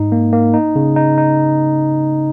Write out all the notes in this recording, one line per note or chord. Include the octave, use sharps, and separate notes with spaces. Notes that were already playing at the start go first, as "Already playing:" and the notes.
Already playing: G#2 D#4
A#3
A#3
D#4
C#3
D#4
D#4